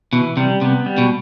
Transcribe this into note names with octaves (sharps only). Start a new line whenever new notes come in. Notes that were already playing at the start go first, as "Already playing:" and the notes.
B2 E3
C3 G3
C3 B3
G3
B2